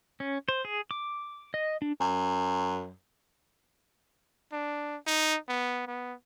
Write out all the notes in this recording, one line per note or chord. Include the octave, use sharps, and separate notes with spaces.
C#4
C5
G#4
D6
D#5
D4
F#2
D4
D#4
B3
B3